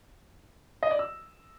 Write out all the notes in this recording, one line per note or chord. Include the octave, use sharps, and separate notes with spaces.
D#5
D5
E6